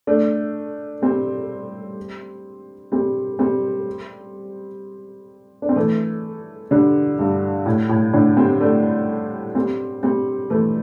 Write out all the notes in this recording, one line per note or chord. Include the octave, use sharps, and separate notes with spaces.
A3 D4
G3 C4
G3 C4
G3 C4
D4
C4
E3 A3
D3 G3
G2
A2
A2
A2 D3
G3 C4
A3 D4
G3 C4
G3 C4
E3 A3